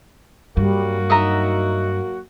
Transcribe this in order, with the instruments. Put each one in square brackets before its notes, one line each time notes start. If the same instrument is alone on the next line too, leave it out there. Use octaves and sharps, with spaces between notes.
[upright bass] G2 [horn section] F#3 A#3 F#4 [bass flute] G3
[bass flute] D#4 [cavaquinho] D#5 E5 A#5